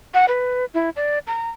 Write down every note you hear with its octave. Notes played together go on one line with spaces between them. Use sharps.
F#5
B4
E4
D5
A#5